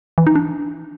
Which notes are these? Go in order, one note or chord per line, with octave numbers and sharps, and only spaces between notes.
E3
D#4
D4